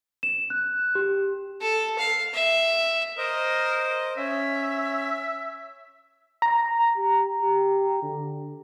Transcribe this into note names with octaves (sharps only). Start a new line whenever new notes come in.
E7
F#6
G4
A4
F5
E5
A#4 C5 D#5
C#4 E5
A#5
G4
G4
D3